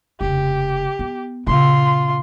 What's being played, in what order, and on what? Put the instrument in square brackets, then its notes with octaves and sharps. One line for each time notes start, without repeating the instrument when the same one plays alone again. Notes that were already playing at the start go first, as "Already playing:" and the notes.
[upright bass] F1 C#3 [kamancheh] G4
[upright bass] B3
[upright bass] A#2 C#3 [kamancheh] F4 C6